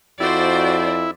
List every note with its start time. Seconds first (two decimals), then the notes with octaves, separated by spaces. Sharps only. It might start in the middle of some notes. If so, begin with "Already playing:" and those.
0.20 F2 E4 F#4 C5 D5